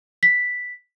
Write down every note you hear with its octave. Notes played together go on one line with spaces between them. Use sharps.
B6